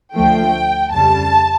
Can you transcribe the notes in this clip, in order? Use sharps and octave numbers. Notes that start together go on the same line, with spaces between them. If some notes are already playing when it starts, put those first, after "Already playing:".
D2 D3 F3 A3 G5
F2 C#3 G3 A5